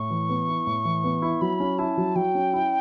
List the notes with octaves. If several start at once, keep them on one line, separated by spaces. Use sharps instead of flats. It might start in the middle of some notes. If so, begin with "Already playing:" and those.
Already playing: A2 C#6
E3
B3
E4
A2
E3
B3
E4
F#3 B5
C#4
E4 A5
F#3
F#3 G5
C#4
E4